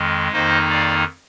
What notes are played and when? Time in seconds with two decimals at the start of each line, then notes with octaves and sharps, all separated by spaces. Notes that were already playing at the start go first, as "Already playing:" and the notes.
Already playing: F2 D#3 G#3
0.32 F2 D#3 A#3 D#4 C5 D#5
0.69 D5 F5